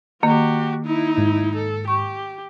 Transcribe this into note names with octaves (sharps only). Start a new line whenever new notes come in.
D#3 A#3 F#4 G4
D#4 E4
G#2
A4
G4 C#6